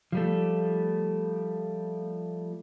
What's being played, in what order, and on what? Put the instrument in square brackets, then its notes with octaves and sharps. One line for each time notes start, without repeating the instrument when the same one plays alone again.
[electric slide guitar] F3 G3 A3